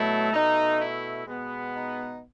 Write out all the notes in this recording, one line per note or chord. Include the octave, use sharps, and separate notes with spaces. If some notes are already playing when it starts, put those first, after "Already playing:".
Already playing: B2 F#3 A3 E4
B2 A3 D#4
E4
B2 G#3 B3
D#4